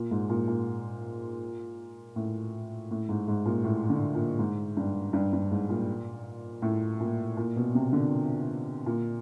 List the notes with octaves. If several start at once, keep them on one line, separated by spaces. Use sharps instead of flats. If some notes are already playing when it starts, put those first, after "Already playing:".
Already playing: A#2
G#2
A#2
A#2
A2
A2
G#2
G#2
A#2
A2
D3
A#2
G#2
G2
G2
G2
G#2
A#2
A2
A#2
A#2
B2
C3
D3
A#2